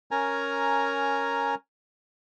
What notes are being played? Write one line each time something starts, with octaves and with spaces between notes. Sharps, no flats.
C#4 A#4 G#5 A#5